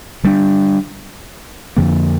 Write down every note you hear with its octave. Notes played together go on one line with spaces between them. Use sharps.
D3 G3 D4
F2 D3 F3 A#3